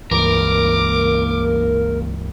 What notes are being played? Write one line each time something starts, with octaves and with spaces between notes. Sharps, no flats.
C#2 G2 E3 A#3 A#4 D6